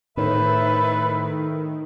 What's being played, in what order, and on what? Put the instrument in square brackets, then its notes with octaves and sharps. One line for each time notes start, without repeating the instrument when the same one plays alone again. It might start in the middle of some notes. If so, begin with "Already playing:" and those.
[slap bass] A2 [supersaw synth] D#3 [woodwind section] A4 C5 E5 [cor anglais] B4